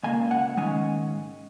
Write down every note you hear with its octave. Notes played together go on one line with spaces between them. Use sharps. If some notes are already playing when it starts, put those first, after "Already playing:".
C#2 C#3 A#3 G#5
F#5
G#2 D#3 G#3 C#4 G#5